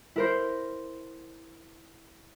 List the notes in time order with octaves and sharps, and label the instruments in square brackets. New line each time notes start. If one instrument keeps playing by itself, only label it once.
[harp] E4 A#4 C5